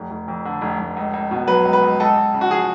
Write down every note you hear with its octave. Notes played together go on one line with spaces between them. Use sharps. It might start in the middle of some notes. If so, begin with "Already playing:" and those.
Already playing: F1
F1
F2
D3
F1
F1
C#2
C#2
B2
F#3 B4
C#2
B4
C#2
C#2 A4
C#2
C#3
F#4
F3 G#4